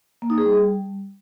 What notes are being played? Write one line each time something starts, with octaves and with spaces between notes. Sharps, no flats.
A#3
D#4
G#4
G3